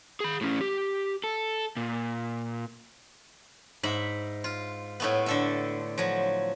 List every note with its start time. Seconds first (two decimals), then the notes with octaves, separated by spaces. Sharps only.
0.20 G#4 B5
0.41 A2 C#4
0.61 G4
1.24 A4
1.77 A#2
3.83 G#2 E5 B5
4.44 F4
5.00 A2 A3 B3
5.26 D3 A4 E5
5.98 F3 F#3